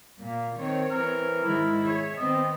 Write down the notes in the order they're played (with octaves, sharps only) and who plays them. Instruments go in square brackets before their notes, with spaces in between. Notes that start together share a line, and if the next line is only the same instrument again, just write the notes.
[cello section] A#2 [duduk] A#3
[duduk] D#3 [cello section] C4 C#5
[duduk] E3 [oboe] A#4
[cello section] G#2 D#3 G#3 [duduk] E4
[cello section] G#4 C#5 E5
[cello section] D#3 B3 [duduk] C4 [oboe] D#5